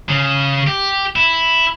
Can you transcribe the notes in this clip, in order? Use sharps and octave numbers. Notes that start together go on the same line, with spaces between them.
C#3
G4
E4